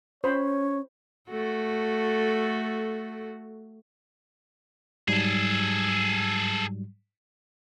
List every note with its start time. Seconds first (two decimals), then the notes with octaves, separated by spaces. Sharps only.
0.24 C#4 C5 C#5 B5
1.30 A3 F#4 A4
5.08 G#2 F#3 G3 G#4 A4